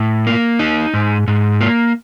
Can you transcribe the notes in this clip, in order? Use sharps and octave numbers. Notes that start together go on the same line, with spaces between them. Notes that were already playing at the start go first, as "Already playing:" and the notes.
Already playing: A2
A#3
D#4
G#2
G#2
A#3